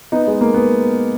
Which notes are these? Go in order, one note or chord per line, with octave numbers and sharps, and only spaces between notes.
B3 D#4
G#3
A#3
B3